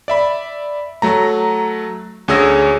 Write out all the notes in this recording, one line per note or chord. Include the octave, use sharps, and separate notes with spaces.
D5 E5 B5
F#3 A3 A#5
D2 C#4 G#4 C#5 E6 A#6